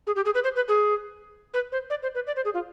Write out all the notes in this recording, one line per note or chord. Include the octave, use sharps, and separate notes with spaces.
G#4
G4
G#4
B4
C5
B4
G#4
B4
C5
D5
C5
B4
D5
C5
G#4
F4